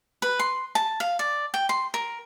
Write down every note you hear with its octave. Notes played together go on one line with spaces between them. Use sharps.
B4
C6
A5
F5
D5
G5
C6
A#4